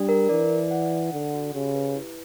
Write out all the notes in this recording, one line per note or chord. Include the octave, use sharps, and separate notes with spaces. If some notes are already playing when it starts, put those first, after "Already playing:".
Already playing: G3 D4
A#4
E3 D5
D5
F#5
F#5
D3 F#5
F#4
C#3 G4
B4
E4